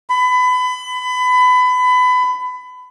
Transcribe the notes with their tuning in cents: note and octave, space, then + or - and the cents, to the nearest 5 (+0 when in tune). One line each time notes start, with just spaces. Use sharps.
B5 +25